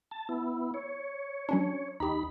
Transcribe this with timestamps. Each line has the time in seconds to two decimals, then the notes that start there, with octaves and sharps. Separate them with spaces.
0.11 A5
0.29 B3 E4
0.74 C#5
1.49 F#3 C#4 D4
2.00 D#2 D#4 G4 A#5 B5